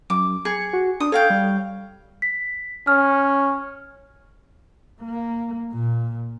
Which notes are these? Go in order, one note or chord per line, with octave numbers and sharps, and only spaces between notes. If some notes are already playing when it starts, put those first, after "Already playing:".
F#2 D6
G#4 C#7
F#4
D4 D#6
A4 C#5 F5 G5
G3
B6
C#4 F6
A#3
A#2